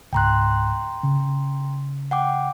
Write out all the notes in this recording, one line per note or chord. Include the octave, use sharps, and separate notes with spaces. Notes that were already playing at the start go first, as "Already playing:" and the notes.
C#2 G#2 G5 A#5 C6 F#6
C#3
F#5 G5 D6